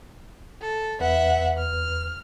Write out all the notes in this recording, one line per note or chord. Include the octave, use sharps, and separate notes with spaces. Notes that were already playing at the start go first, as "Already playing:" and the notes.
A4
E2 B4 E5 F#5
F6